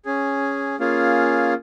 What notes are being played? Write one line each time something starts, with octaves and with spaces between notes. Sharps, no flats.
C#4 G#4
A#3 C#4 F4 G#4